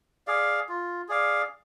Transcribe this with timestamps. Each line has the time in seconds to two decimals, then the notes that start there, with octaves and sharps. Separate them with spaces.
0.27 G#4 D5 F5
0.69 F4
1.09 G#4 D5 F5